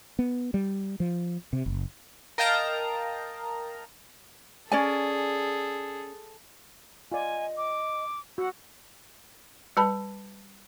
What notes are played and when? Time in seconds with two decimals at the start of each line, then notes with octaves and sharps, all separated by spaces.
0.19 B3
0.54 G3
1.00 F3
1.53 C3
1.66 F#1
2.38 A#4 D#5 F5 G5 A5 A#5
4.72 C#4 G#4 A4 D5 G#5
7.12 F4 D5 D#5 G#5
7.57 D6
8.38 F#4 F#5 E6
9.77 G3 B4 A5 B5